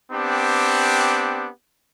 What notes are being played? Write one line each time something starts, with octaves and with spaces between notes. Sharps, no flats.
B3 C4 D4 G4